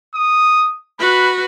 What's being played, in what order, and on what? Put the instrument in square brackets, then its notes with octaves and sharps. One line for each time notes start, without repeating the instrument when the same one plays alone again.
[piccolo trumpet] D#6
[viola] F#4 B4 [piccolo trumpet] B5